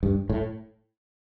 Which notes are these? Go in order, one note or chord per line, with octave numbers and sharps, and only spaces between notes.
G2
A2